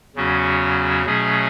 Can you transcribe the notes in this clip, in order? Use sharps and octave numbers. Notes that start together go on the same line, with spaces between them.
E2 C#3 F#3 C#4 F#4
B2 F#3 A3 C#4 G#4